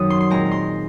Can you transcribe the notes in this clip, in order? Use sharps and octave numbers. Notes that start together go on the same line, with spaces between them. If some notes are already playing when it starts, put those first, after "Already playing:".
Already playing: F#2 D#3 F#3 C4 D#6
C6
C6
A#2 G#3 C4 A#5
C6